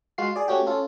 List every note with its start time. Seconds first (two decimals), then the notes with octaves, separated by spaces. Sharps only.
0.18 G#3 F4 F#4 C7
0.36 G#4 D5
0.48 A3 C#4 F#4 G4
0.67 C#4 F4 A4